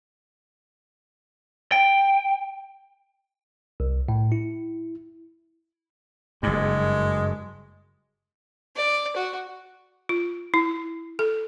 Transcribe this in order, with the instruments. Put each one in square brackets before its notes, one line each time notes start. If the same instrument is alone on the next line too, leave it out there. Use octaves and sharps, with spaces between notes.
[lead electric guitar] G5
[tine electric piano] C2
A2
E4
[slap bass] F#1 G2 [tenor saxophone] G#3
[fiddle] D5
F#4
[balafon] F4
E4
A4